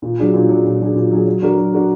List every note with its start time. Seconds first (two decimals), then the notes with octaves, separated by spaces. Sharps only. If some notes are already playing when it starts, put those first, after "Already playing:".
0.02 A#2
0.18 F#3 D4 G#4
0.34 A#2
0.49 F#3 D4 G#4
0.65 A#2
0.80 F#3 D4 G#4
0.95 A#2
1.11 F#3 D4 G#4
1.26 F#3
1.42 D4 F#4 A#4
1.58 F#3
1.73 D4 F#4 A#4